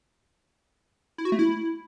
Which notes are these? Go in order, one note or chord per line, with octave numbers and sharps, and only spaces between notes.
E4
F#4
A3
E4